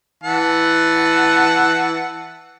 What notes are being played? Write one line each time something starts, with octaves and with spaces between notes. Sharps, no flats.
E3 F#5 A5